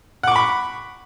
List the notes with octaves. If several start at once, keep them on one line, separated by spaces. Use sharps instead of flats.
F#5 B5 C#6 D6